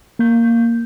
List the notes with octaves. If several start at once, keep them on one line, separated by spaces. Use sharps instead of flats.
A#3 G6